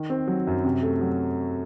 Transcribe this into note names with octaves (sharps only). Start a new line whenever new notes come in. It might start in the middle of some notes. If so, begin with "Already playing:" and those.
Already playing: D#3
C4
F#3
F#2
C3
A3
F#3